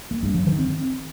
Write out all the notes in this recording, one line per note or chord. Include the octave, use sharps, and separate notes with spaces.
A#3
G2
F#3
D#3
C4